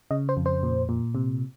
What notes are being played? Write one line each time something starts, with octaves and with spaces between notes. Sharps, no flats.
C#3 D#5
C5
F2
C5
A#2
A#2
C3